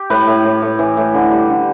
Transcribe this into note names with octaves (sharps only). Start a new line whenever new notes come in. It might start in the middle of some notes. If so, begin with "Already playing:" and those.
Already playing: G4
A2 B4
A2
A2
A2
E3
A2
D3
G3
D3